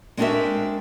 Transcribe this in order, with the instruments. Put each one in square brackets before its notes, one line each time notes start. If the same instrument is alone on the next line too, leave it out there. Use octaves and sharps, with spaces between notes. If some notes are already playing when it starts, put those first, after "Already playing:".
[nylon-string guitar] G#3 C4 D4 F#4 A#4 E5